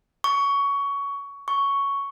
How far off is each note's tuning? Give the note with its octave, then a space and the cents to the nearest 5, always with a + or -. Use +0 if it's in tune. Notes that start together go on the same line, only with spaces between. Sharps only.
C#6 +20
C#6 +5